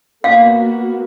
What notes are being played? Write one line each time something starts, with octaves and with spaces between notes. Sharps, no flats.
A#3 B3 F#4 F5